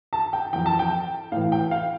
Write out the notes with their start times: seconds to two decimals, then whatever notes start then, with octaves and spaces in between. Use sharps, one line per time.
0.13 A5
0.33 G5
0.53 E3 G5
0.56 F2
0.66 A5
0.79 G5
1.32 A2 F5
1.36 E3
1.52 G5
1.71 F5